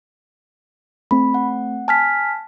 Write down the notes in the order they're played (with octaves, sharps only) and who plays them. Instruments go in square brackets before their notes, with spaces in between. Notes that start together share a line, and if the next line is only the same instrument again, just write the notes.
[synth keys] A3 C4 [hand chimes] B5
[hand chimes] F#5
[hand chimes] G#5 F6 B6 [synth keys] A5